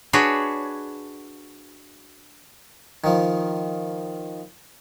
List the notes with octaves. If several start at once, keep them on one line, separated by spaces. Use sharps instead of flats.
D4 F#4 G#4 B4 C#5
D#3 F3